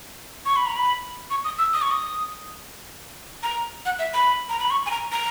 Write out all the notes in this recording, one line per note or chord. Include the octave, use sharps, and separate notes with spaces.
C#6
B5
A#5
B5
C#6
D#6
E6
D#6
C#6
D#6
A#5
F#5
E5
B5
A#5
B5
C#6
G#5
A#5
A#5